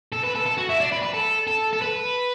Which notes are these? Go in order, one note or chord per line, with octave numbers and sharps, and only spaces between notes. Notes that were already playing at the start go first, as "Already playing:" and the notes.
A4
B4
A4
A4
F#4
E4
D4
B4
B4
A4
A4
A4
B4